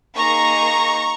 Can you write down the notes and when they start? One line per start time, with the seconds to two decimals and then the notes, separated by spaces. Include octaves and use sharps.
0.15 A#3 D#4 G#4 A#5 C#6